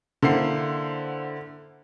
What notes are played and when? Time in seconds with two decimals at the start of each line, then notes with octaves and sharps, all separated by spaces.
0.22 D3 A#3 E4 C5 F#5 C7